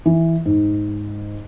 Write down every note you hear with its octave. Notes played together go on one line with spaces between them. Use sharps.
E3
G#2